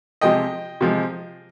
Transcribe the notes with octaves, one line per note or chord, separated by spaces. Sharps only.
C3 F3 G#3 D#5 G5
C3 F3 G#3